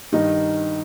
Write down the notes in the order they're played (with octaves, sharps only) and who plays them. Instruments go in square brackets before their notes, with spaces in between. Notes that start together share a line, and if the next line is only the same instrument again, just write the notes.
[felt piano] G2 D#3 D#4